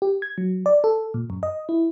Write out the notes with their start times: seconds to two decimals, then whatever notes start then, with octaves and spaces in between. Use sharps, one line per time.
0.02 G4
0.22 G#6
0.38 F#3
0.66 D5
0.84 A4
1.14 A#2
1.30 F#2
1.43 D#5
1.69 E4